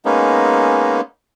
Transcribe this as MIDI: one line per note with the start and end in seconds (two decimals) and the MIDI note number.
0.05 1.01 56
0.05 1.01 58
0.05 1.01 59
0.05 1.01 61
0.05 1.01 63